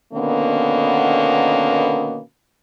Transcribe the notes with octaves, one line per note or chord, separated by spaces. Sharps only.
B2 D3 D#3 A#3 B3 C#4